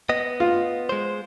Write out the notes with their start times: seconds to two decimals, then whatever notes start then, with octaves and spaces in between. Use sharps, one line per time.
0.09 B3 D#5
0.40 F4
0.89 G#3 C5